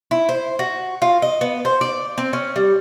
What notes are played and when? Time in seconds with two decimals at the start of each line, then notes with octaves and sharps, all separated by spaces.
0.11 E4
0.29 C5
0.59 F#4
1.02 F4
1.22 D#5
1.41 B3
1.65 C5
1.81 D5
2.18 C4
2.33 C#4
2.56 G3